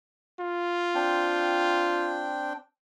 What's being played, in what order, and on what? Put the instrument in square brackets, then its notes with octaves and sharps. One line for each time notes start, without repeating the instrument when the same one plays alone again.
[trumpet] F4
[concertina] C4 D4 G5